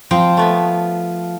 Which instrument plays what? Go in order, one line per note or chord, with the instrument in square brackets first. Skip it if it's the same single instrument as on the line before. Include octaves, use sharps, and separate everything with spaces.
[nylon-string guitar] F3 [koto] C4 G5
[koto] A3 B3 B4